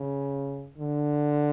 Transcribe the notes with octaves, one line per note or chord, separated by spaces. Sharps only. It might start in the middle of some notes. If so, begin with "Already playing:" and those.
Already playing: C#3
D3